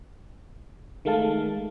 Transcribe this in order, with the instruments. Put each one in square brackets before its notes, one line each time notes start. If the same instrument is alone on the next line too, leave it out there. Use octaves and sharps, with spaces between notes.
[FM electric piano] D#3 G#3 A3 F5 A5